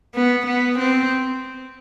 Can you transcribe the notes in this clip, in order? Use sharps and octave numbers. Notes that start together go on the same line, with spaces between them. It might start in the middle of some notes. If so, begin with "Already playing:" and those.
B3
B3
C4